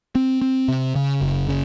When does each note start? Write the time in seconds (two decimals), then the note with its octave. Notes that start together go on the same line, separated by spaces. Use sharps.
0.15 C4
0.42 C4
0.68 C3
0.95 C#3
1.21 F#1
1.49 C#3